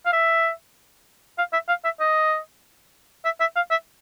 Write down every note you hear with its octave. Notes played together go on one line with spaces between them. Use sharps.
F5
E5
F5
E5
F5
E5
D#5
E5
E5
F5
E5